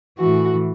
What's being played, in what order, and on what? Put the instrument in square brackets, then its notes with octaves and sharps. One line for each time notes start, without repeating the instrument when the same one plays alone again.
[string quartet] A2 E3 F#4